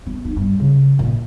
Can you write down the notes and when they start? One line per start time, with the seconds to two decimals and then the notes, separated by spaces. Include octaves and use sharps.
0.06 B3
0.25 D#4
0.37 G2
0.60 C#3
0.99 A#2